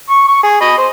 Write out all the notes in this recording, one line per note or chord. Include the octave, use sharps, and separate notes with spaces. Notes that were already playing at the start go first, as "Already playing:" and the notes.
C#6
C#6
G#4
D#5 B5
C5